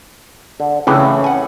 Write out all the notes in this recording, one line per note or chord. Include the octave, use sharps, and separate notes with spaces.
D3
A2 C#3 E3 C#4
F#5 G#5